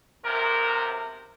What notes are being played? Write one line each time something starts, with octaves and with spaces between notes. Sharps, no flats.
B1 C3 A#4